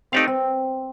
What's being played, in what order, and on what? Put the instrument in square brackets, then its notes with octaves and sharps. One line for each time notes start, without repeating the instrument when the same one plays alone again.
[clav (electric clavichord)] A3 D#4 G4 D5 F5 [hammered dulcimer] C4
[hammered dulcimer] C4